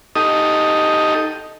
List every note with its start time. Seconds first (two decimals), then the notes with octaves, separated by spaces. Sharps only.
0.16 D#4 G4 A4 D#5